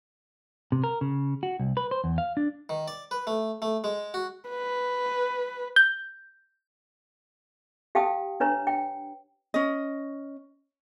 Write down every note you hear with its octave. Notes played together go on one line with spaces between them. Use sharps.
C3
A#4
C#3
F#4
C2
B4
C5
E2
F5
D4
D#3
D5
B4
A3
A3
G#3
F#4
B4
G6
G4 F5 G5 A5 D#6
D4 B4 C#5 A#5
G5
C#4 D#5